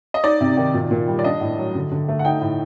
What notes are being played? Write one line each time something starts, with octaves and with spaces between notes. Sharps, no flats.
D#5
D#4 D5
C3
D#3
A#2
A#2
G3
D5
D4 D#5
A2
F#3
D3
D3
A3
F#5
D#4 G5
A2